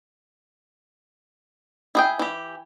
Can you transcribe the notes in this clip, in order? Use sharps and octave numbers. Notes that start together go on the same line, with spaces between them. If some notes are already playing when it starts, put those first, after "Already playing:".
E4 G#4 G5
E3 G4